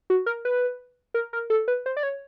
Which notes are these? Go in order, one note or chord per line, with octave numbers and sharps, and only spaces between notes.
F#4
A#4
B4
A#4
A#4
A4
B4
C5
D5
C#5